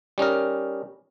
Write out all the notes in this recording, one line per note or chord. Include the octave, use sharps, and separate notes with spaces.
G3 C#4 D#4 A#4